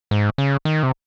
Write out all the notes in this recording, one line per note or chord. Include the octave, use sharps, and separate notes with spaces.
G#2
C#3
D#3
C3